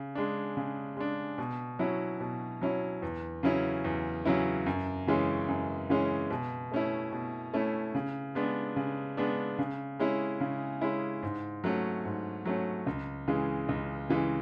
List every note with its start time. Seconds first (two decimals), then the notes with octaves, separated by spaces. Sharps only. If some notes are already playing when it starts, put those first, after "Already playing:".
Already playing: C#3
0.15 G#3 D4
0.57 C#3
0.97 G#3 D4
1.38 B2
1.79 F#3 C#4 E4
2.20 B2
2.61 F#3 C#4 E4
3.02 E2
3.43 C#3 F#3 C#4 E4
3.84 E2
4.25 C#3 F#3 C#4 E4
4.66 F#2
5.07 C#3 E3 G#3 C#4
5.48 F#2
5.90 C#3 E3 G#3 C#4
6.30 B2
6.72 A3 C#4 E4
7.12 B2
7.54 A3 C#4 E4
7.95 C#3
8.35 G#3 B3 D4
8.76 C#3
9.17 G#3 B3 D4
9.59 C#3
9.99 G#3 C#4 E4
10.40 C#3
10.81 G#3 C#4 E4
11.23 G#2
11.64 F#3 A3 C#4
12.05 G#2
12.45 F#3 A3 C#4
12.87 C#2
13.28 C#3 E3 G#3
13.69 C#2
14.10 C#3 E3 G#3